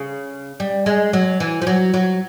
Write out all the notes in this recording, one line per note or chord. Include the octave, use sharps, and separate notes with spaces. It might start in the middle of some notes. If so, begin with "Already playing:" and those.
Already playing: C#3
G3
G#3
F#3
E3
F3
F#3
F#3